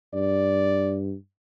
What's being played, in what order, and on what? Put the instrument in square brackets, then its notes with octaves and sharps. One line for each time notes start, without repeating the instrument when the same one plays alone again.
[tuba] G2 [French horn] D5